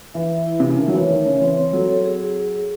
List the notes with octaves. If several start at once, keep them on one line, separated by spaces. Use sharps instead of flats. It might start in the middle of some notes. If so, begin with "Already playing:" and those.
E3 E5
E5
E4
C3 E5
C#3
D#3 A3
F#3
E3 C#5
D#3 A3
C#3 C#5
E3 C4
C4
F#3 A4
A4
G#4